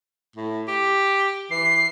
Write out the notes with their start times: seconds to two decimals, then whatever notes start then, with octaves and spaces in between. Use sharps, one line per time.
0.36 A2
0.68 G4
1.51 E3 C7